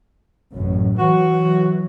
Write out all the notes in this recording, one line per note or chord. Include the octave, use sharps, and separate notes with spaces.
A1 F#2
E3 F#3 F#4